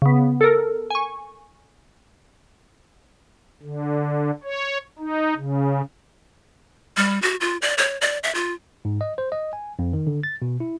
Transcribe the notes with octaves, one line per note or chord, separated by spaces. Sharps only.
C#3 B3
A4 A#4
G#5 C#6
D3
C#5
D#4
C#3
G3
F#4
F4
D5
C#5
D5
E5
F4
G#2
D#5
C5
D#5
G#5
F2
D#3
D3
A6
B2
E4